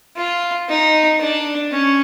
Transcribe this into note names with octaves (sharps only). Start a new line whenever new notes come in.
F4
D#4
D4
C#4